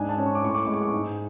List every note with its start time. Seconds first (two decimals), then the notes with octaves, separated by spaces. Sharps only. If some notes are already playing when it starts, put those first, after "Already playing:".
Already playing: G#2 D4 G#5
0.09 A5
0.18 C#4
0.26 C#6
0.35 D6
0.43 A2 C#6
0.55 D6
0.64 G#3 C#6
0.74 D6
0.82 C#6
0.93 G#2